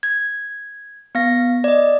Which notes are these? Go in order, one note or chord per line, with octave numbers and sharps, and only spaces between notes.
G#6
B3 F5 A#6
D5 D#5